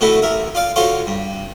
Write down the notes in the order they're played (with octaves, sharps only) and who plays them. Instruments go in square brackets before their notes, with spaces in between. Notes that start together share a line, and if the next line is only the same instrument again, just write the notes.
[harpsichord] B2 D3 A3 B3 E4 F#4
A1 A#4 E5
F4 D5 F5
D3 F4 F#4 C5 C#5 C6
G2